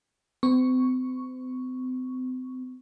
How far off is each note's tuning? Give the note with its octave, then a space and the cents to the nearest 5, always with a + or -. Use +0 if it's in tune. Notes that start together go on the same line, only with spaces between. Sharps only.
C4 -40 C#6 +0